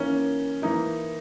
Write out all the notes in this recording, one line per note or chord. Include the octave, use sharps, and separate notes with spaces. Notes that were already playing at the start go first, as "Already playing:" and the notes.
Already playing: E3 A#3 C#4 D#4
E3 A#3 D#4 E4